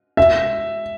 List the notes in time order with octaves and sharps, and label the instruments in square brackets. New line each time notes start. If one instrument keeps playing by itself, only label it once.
[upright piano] E5